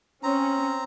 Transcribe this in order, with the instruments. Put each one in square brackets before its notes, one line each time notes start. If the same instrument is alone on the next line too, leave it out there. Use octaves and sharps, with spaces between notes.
[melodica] C4 A#5 [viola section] C#4